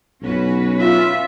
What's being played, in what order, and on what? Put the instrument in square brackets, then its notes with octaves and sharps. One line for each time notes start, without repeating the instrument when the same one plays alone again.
[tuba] B1 [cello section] C#4 F#4 B4
[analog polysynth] F4 [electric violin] E5